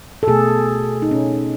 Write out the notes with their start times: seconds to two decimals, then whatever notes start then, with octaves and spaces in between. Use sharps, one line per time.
0.23 A4
0.27 B2 A3 G#4
1.02 D#4
1.11 B2 A3 C#4